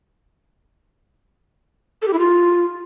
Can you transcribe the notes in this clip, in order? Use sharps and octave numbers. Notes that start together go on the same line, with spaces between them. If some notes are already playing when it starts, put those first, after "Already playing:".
A4
G4
E4
F4